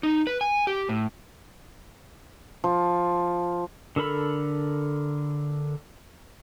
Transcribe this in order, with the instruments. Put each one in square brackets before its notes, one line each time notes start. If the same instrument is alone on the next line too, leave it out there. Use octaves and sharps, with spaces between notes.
[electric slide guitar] D#4
B4
G#5
G4
A2
[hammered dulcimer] F3
[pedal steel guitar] D3 A4 A#4 B5 E6